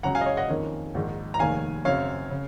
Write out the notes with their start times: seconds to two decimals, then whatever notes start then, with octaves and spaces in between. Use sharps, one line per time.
0.03 C#2 C#3 F#3 C#4 F#5 A#5
0.15 F5 G#5
0.21 D#5
0.26 C#5 F5
0.37 D#5 F#5
0.49 F2 D#3 A#3 C#4
0.95 A#1 G#2 D#3
1.34 A#5
1.39 F1 D#2 D#3 F5 G#5
1.85 F#2 C#3 F#3 C4 C#5 F5
2.31 C#3